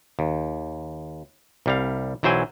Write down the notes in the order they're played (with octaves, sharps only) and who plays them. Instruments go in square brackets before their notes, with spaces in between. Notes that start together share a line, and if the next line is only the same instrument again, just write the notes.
[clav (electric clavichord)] D#2
C2 G3 F5
B1 E3 F#3 C5 G5 G#5